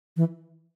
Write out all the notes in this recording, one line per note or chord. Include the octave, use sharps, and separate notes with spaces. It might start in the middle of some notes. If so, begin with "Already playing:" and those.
E3